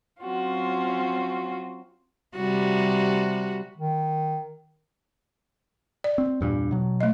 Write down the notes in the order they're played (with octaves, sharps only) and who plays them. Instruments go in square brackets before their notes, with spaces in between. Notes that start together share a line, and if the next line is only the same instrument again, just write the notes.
[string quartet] F#3 C4 C#4 F4 F#4
[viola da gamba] C3 G3 F#4
[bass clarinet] D#3
[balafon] D5
[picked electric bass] C4
E2 G2 A#2
B2 F#3
[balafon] A3 D#5